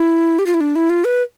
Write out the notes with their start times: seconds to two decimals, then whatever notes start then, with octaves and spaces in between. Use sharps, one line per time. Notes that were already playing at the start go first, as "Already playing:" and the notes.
Already playing: E4
0.39 G4
0.46 F4
0.54 E4
0.60 D4
0.75 E4
0.90 F4
1.04 B4